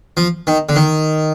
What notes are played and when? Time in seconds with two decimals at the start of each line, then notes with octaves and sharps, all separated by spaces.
0.17 F3
0.47 D#3
0.69 D3
0.76 D#3